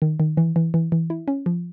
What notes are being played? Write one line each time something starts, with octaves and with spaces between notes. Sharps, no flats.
D#3
D#3
E3
E3
E3
E3
E4
C#4
F3